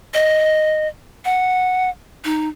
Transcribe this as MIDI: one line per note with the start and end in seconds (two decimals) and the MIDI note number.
0.14 0.88 75
1.25 1.90 78
2.25 2.48 63